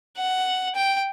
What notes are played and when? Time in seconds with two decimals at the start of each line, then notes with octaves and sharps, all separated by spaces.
0.17 F#5
0.75 G5